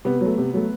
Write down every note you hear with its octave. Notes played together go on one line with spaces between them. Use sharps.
C3 B3
F#3 A3
C3
F#3 A3